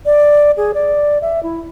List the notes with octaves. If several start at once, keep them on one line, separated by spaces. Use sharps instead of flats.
D5
G#4
D5
E5
E4